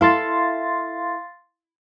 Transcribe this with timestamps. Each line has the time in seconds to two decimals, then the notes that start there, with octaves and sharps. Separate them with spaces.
0.01 E4 A4 F5 C6 A6